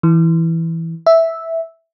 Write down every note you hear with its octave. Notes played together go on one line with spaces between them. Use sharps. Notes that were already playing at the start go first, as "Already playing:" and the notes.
E3
E5